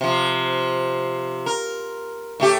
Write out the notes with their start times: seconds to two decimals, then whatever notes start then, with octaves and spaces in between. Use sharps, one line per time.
0.01 C3 F3
1.46 A#4
2.40 A2 A3 G4